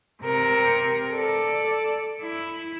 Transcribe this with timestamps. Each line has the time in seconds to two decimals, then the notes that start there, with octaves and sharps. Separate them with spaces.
0.23 C3 A#4
1.13 A4 D5
2.22 E4